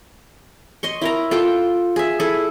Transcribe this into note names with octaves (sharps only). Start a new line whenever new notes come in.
D#5 C6 C#6
E4 A#4 A#5
F4 A4 G5 A5
G#4 E5
E4 G#4 A4